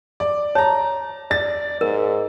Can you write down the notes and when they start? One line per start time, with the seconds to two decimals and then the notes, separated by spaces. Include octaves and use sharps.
0.20 D5
0.55 C#5 A5 A#5
1.31 D5 A6
1.81 G#2 A#4